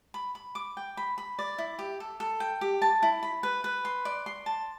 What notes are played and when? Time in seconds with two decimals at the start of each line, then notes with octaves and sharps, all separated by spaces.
0.14 B5
0.35 B5
0.55 D6
0.77 G5
0.97 B5
1.18 B5
1.39 D5
1.58 E4
1.79 G4
2.00 A4
2.20 A4
2.40 G5
2.61 G4
2.82 A5
3.03 E4
3.23 B5
3.43 B4
3.64 B4
3.85 C6
4.05 D5
4.26 C6
4.46 A5